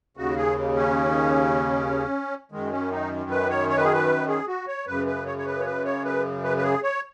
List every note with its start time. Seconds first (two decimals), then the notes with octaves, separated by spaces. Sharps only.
0.17 D#2 C#3 F#4
0.36 G#4
0.76 C#4
2.52 F#2 D#3 G#3
2.72 C#4
2.92 D#4
3.30 B4
3.50 C#5
3.70 C#5
3.77 B4
3.85 G#4
3.93 B4
4.28 G#4
4.48 F#4
4.68 C#5
4.87 F#2 C#3 B4
5.06 B4
5.26 C#5
5.38 C#5
5.46 B4
5.60 C#5
5.65 B4
5.85 C#5
6.05 B4
6.44 B4
6.57 B4
6.63 G#4
6.83 C#5